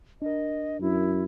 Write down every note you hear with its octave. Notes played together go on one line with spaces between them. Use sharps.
D4 A#4 D#5
F#2 E4